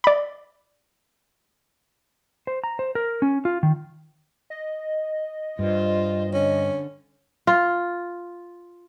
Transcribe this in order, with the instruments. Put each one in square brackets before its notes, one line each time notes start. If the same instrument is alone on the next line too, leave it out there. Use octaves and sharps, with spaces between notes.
[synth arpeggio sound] D5 B5
[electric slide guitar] C5
A#5
C5
A#4
C#4
F4
D#3
[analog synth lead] D#5
[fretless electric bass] G2 [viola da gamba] F4 C5
[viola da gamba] D3 [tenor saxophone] C#4
[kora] F4